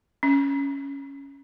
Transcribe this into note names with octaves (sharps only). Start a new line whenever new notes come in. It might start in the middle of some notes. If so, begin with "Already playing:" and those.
C#4